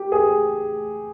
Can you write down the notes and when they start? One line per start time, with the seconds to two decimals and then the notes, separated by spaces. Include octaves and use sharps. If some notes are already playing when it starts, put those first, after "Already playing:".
Already playing: G4
0.12 G#4